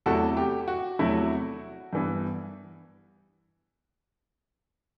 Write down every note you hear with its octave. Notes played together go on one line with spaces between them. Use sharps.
E2 C3 F#3 A3 E4 F#4 A4
G4
F#4
E2 C3 F#3 A3 E4
G2 E3 B3